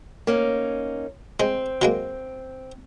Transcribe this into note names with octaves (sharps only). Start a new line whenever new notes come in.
A#3 C#4 D#4
G#3 C4
F#3 G#3 A#3